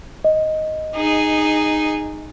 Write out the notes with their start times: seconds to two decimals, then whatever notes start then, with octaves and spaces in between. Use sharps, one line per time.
0.24 D#5
0.95 D#4 G#4